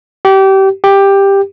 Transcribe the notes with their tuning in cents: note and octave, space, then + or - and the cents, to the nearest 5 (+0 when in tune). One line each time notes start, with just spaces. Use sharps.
G4 -25
G4 +10